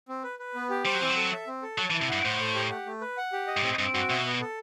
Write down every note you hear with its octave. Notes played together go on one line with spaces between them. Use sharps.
C4
B4
B4
B3
G4
G3 C5
F#3
E3 C4
F#3
A4
E5
C4
A4
F#3 A5
E3
E4
C3
G2 F#5
A2 C5
A3
G4
F#5
A3
B4
F#5
G4
D#5
G2
A2 C4
G2 C4
G2 F#4
B2 E5
B3
A4